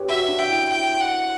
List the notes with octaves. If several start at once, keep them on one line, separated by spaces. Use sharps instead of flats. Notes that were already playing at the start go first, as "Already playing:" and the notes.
Already playing: G4 B4 C#5
F#4 E5
D4
G5
E4
G5
F#5